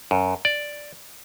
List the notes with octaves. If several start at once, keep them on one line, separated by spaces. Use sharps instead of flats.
F#2
D5